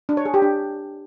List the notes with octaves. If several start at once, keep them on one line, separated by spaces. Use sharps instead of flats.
D4
C#5
G#4
G4
D4